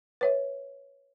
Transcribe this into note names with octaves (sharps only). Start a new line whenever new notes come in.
B4 C#5 E5